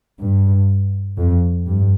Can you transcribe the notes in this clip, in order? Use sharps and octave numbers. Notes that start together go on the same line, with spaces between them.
G2
F2
G2